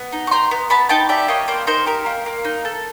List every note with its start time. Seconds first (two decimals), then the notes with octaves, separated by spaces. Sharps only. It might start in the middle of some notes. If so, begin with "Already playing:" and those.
Already playing: B3
0.13 D#4
0.27 C#6
0.31 G4 A#5 C6
0.51 B3
0.70 B3 A5 B5
0.89 D#4 G5 A5
1.09 G4 D5 E5
1.28 A#3 C#5 D#5
1.48 A#3 C5 D5
1.67 D#4 A#4 C5
1.86 G4 A#4
2.06 A#3
2.26 A#3
2.45 D#4
2.65 A4